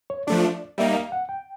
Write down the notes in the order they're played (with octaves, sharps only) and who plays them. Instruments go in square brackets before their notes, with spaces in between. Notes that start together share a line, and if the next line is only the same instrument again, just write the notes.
[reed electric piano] C#5
[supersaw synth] F3 A3 D4 [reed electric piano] D5
[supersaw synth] G3 A#3 D#4 [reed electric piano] E5
[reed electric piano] F5
F#5
G5